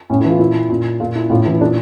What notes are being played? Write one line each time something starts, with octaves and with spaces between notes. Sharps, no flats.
A2 C#4
E4
E3
F4
A#2 E4
A#2
A#2 F4
E4
A2 F4
E3 E4
A#2 D4